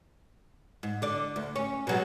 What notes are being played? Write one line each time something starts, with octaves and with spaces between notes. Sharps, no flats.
G#2
D3 D5
D2
C#4
B2 F#3 G#3